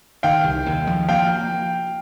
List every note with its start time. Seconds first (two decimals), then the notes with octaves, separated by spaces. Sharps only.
0.23 D#3 F5 G5
0.44 C2
0.66 D#2
0.87 F3
1.09 A#3 F5 G5